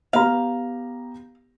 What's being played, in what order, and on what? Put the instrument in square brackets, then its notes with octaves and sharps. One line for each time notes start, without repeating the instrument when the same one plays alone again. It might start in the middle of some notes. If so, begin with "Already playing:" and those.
[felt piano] B3 G4 A#5 [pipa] F5